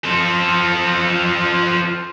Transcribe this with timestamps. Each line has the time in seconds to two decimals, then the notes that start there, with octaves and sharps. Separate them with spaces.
0.04 F3 A4